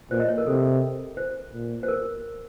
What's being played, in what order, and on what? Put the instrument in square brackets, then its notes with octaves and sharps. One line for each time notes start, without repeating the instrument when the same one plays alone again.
[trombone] A#2 [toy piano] C5
[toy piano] D#5
C#5
A#4
[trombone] C3 [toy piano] A4
[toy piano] C5
[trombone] A#2
[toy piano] C5
A#4